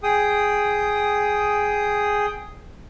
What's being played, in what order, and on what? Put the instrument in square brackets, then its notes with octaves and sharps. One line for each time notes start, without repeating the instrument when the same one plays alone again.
[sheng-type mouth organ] G#4 G5 D#6